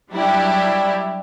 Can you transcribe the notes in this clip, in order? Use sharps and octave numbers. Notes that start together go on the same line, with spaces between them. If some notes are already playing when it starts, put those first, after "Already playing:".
F#3 G3 D4 E4 G4